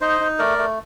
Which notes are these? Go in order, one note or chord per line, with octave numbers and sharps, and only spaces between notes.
D#4 C5 D#5
D#4
A3 A#4 D5
A3